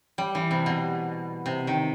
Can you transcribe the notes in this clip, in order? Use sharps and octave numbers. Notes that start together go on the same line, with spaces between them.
G3
E3
C3
B2
C3
D#3